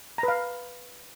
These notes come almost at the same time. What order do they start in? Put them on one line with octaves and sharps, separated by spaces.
A#5 B4 F5